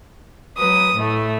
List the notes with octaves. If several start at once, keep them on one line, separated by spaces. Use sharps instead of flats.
F#3 B4 D#6
A2 A3